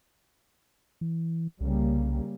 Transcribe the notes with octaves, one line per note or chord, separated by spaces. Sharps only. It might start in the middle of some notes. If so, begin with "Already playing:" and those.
E3
C2 C#3 G3 A#3